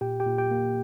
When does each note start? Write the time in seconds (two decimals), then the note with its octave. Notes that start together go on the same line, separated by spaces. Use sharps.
0.01 A#2 G4 G5
0.20 G4 G5
0.26 A#2
0.38 G4 G5
0.51 A#3